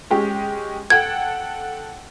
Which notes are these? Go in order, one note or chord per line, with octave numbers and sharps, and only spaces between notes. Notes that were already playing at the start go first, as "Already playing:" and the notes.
G#3 C#4 G4
A4 F#5 G5 G#6